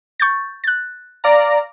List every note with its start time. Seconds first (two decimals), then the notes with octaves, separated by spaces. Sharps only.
0.20 C#6 G6 A6
0.64 F#6 A6
1.24 D5 F5 A#5